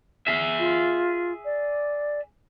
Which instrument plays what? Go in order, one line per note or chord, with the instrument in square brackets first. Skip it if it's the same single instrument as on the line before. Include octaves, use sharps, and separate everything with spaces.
[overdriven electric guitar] G#4 E5
[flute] F4
D5